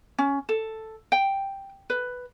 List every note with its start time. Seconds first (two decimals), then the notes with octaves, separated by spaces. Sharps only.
0.18 C#4
0.49 A4
1.12 G5
1.90 B4